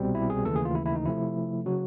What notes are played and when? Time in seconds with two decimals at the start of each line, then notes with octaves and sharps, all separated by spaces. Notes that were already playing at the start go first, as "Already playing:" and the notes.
Already playing: C2 B2 G3 C4
0.15 E4
0.30 G#4
0.45 D#2 C#3 E3 A3 A4
0.55 G#4
0.65 F4
0.75 E4
0.86 E4
0.95 D#4
1.06 C3 F3 A3 E4
1.66 C#3 F#3 F#4